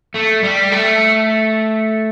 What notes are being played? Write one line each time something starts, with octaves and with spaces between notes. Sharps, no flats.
A3
G3
A3